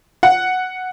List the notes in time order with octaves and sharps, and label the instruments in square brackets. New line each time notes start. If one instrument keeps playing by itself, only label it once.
[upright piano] F#5